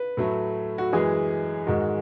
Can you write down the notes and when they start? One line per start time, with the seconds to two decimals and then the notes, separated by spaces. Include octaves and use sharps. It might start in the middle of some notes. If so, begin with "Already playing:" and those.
Already playing: B4
0.17 A2 F#3 A3
0.78 F#4
0.92 F#2 E3 G#3 G#4
1.67 G#2 D#3 G#3 F#4